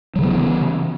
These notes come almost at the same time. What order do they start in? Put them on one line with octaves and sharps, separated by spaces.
F#3 C#3 E3 B3